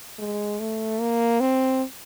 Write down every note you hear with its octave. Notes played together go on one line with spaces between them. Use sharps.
G#3
A3
A#3
C4